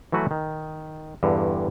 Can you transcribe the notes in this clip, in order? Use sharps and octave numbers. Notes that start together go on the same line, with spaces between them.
E3 F#3 A3 F#4 B4
D#3
E2 G2 D3